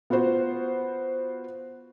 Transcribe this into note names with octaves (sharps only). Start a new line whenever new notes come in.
B3 F4 F#4 C5